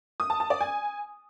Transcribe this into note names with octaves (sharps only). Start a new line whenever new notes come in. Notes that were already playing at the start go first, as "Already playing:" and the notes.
D#6
A5
A5
D5
G#5